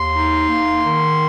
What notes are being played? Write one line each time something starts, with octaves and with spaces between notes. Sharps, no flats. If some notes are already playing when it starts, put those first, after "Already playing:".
Already playing: D#2 C6
D#4
A#3
D#3